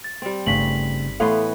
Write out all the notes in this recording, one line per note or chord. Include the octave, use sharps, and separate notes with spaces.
A6
G3 C4
G1 C#3 A3 D#4 B6 F#7
A2 E3 A3 B3 A4 F5 C6